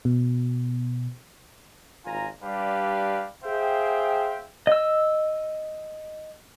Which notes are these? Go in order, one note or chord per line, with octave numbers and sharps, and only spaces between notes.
B2
G#1 F4 G#5 A#5
G3 D4 G4 B4 D5 F5
G#4 C5 E5 F5 G5
D#5 E6